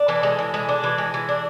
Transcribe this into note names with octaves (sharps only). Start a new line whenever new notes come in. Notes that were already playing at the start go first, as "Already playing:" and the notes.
Already playing: D4
E3 A4
G#3
E3
G#3
D4
E3
G#3
E3
D4